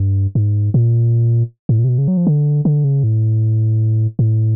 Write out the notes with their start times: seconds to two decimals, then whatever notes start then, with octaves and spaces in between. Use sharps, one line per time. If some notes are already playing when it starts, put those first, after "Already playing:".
Already playing: G2
0.35 G#2
0.74 A#2
1.69 A2
1.79 A#2
1.84 C3
1.89 B2
1.98 C#3
2.08 F#3
2.17 F3
2.27 D3
2.65 D3
2.84 C#3
3.04 A2
4.19 A2